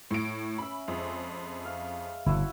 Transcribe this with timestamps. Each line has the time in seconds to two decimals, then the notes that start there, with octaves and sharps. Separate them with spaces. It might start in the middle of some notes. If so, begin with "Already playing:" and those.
0.11 A2 D7
0.58 C#4 E5 B5
0.88 F2 G#3
1.65 F5
2.26 G1 A#2 C#3 E4 F#4